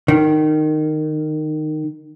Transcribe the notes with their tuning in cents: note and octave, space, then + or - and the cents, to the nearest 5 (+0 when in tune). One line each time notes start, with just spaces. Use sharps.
D#3 -15